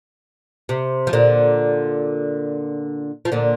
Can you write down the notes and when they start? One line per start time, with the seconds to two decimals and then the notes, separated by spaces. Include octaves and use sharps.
0.69 C3
1.07 F3
1.13 A#2 D3
3.25 F3
3.32 A#2 D3